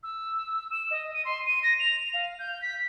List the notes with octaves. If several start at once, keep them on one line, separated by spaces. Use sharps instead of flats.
E6
E7
D#5
D#7
C6
D#7
A#6
F7
F5
G6
B6